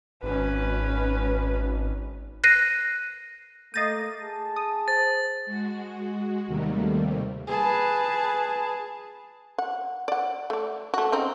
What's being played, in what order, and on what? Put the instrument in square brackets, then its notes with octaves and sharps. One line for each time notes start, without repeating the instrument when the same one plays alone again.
[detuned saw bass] G#1 [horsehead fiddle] C#4 B4
[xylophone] F#6 A#6 C7 D#7
[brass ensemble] A3 A#3 [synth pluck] D#5 A6 D#7 [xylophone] G6 A#6 C7
[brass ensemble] G#4 A5
[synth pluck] D#6
[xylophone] C5 [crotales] A6
[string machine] G#3 F#4
D#2 C3 D#3 G3 A3 A#3
[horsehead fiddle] G#4 A5 [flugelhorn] B4
[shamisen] F#5
D5 F#5
A3 D5
A3 F#4
C#3 C4 D#4